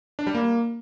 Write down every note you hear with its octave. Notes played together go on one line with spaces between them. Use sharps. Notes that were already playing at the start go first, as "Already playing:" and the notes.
D4
G3
A#3